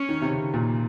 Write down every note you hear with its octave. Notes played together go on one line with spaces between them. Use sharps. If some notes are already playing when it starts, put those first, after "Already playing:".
Already playing: C#4
D#3
C3
C#3
A#2